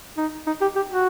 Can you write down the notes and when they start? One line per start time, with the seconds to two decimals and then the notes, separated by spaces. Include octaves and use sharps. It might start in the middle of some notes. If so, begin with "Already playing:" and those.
0.17 D#4
0.47 D#4
0.61 G4
0.76 G4
0.91 F#4